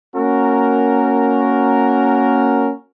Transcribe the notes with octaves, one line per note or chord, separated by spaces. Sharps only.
A#3 C#4 F#4 A#4